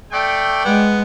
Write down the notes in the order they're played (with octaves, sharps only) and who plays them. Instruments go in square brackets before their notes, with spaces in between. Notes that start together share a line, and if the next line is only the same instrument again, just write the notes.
[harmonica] A3 [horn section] D5 G5
[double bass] G#3 [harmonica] B3